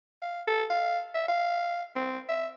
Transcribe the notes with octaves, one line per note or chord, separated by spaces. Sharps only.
F5
A4
F5
E5
F5
C4
E5